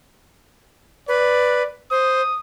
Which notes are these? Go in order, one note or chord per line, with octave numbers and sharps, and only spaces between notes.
B4 D5
C5 D#6